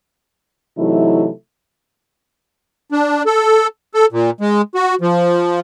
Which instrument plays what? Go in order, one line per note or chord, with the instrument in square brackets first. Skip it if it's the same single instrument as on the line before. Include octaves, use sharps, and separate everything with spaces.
[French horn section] C3 E3 F#3 A3 D#4 E4
[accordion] D4
A4
A4
A#2
G#3
F#4
F3